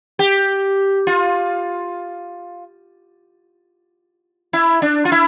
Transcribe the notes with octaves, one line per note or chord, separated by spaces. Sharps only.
G4
F4
E4
D4
F4
E4